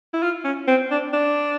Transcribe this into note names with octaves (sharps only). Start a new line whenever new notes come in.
E4
F4
C#4
C4
D4
D4